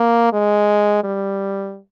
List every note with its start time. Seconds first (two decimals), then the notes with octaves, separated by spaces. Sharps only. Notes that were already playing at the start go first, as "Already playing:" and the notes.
Already playing: A#3
0.33 G#3
1.04 G3